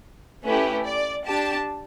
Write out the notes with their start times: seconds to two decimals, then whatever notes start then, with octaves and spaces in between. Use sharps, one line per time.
0.46 A3 C#4 E4 G4 B4
0.86 D5
1.26 D4 G4 A5